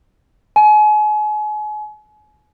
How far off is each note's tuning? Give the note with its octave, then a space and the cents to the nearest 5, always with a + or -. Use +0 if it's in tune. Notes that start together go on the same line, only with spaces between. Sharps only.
G#5 +35